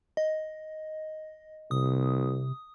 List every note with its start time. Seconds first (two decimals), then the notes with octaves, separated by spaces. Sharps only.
0.17 D#5
1.71 C2 C3 D#6